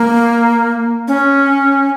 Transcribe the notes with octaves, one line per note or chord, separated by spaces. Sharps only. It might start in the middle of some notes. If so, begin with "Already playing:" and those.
Already playing: A#3
C#4